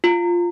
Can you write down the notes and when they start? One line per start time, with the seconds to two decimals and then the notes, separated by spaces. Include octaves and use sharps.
0.04 F4